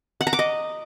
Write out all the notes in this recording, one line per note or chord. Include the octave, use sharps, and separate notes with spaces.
F#5
A#5
D6
D#5